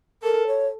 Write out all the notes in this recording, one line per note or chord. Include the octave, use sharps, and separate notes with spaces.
A4 A#4
C#5